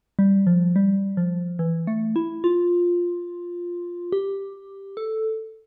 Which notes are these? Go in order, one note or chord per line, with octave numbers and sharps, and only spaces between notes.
G3
F3
G3
F3
E3
A3
E4
F4
G4
A4